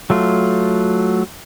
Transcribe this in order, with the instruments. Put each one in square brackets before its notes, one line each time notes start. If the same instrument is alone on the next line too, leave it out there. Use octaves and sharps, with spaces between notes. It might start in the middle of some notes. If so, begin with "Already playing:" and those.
[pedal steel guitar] F#3 A3 F4